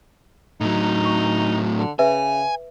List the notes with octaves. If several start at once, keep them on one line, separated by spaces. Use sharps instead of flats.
A2 F#3 D#4
C#6
D3
C#3 B4 E5 G#5